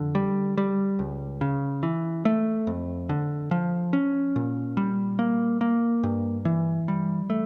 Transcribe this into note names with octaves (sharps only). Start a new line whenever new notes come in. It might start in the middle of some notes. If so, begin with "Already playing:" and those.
Already playing: F2 D3
G3
G3
C#2
C#3
E3
A3
F2
D3
F3
C#4
A#2
G3
A#3
A#3
G2
E3
G3
A3